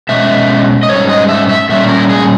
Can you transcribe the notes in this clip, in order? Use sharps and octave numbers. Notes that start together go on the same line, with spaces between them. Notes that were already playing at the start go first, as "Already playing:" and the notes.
B2 G#3 C#4 E5
D#5
G#2 G3 C#4 C#5
D#5
E5
E5
A#2 G3 C#4 E5
A#4
G#4